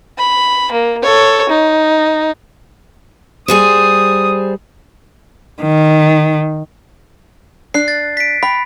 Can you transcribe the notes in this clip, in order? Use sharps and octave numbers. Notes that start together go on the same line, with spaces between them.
B5
A#3
A4 C#5
D#4
G3 G#4 C5 D#6
D#3
D4 F#6 C7
A6
B6 D7
G5 B5